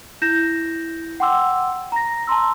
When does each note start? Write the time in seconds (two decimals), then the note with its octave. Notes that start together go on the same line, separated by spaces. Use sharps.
0.22 E4 G6 A#6 E7
1.20 F#5 G5 C6 D6 E6
1.92 A#5 A#6
2.27 A5 A#5 C6 E6